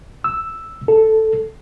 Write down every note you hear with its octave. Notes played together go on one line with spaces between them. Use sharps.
E6
A4